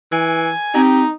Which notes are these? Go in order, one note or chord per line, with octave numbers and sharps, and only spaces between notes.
E3 G#5
C4 D#4 G4